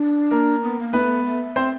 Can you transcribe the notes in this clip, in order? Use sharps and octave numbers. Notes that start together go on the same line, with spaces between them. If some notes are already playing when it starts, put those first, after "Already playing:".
Already playing: D4
A#3 A#4
B3
A#3
A3 B3 B4
A3
C4 C5